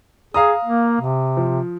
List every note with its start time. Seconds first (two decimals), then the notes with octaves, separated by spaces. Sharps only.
0.34 G#4 F5 A#5 D#6
0.65 A#3
1.01 C3
1.37 F3